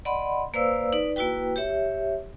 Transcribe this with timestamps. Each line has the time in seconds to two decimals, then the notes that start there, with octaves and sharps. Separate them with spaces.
0.05 D5 D#5 F#5 B5 C6
0.54 A#3 B4 C5 D5 F5 E6
0.93 D#4 B4 D5
1.16 A#3 E4 F#4 B4 G5
1.56 G4 C#5 E5